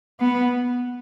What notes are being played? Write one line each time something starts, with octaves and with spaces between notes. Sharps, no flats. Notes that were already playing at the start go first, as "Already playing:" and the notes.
B3